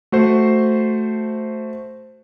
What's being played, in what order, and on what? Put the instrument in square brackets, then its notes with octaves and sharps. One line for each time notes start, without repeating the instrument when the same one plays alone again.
[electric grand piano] A3 F#4 C5